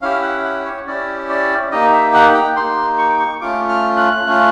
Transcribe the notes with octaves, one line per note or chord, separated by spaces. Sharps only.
C#4 E4 G4 F5
F#5
F#5
C#5
C#4 E4 G4 D5
D5
A#3 D#4 G4 D#5
E5
F#5
G5
A#3 D#4 G4 C6
C#6
D6
C#6
A3 C#4 F4 D6
F6
F#6
A3 C#4 F4